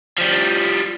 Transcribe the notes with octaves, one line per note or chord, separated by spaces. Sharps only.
F3 G3